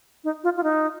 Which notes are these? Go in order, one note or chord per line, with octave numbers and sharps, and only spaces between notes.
D#4
F4
F4
D#4